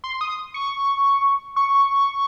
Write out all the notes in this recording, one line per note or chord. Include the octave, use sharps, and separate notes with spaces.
C6
D#6
C#6
C#6